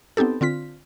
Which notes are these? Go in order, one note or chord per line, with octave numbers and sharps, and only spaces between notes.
B3 C4 D#4 G4 A4
D3 C4 F4 B6